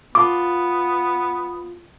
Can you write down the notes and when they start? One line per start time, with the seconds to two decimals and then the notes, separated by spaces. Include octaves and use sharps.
0.15 B3 F4 F5 A5 D6